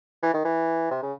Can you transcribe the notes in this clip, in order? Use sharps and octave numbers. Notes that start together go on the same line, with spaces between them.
E3
D#3
E3
C3
C#3